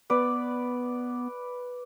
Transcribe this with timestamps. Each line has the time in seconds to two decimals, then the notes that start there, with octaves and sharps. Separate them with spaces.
0.10 B3 B4 D5